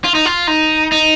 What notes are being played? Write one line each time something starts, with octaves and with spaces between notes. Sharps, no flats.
F4
D#4
F4
D#4
D#4